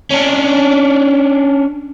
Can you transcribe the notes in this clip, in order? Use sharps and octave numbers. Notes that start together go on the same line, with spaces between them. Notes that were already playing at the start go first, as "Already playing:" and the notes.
C#4 D4